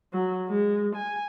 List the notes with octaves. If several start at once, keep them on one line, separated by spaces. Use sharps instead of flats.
F#3
G#3
G#5